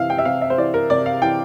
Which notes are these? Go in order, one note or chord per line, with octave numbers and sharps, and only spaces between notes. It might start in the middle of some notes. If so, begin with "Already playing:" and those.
Already playing: C3 E3 E5 F5
G5
E5
C3 F5
E5
C5
E3 D5
A#4
C3 D5
F5
E3 G5